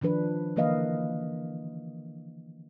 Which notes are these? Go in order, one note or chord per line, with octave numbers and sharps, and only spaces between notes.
D#3 F3 D4 B4
D3 E3 A#3 B4 D#5 F5